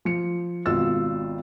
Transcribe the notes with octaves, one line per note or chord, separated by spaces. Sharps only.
F3 C#7
G#1 B2 F4 F#4 E6 A6